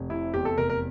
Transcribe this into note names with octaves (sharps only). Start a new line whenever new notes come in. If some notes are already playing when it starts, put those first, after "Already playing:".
Already playing: F1
C3 E4
E2 G4
A4
F1 A#4
A#4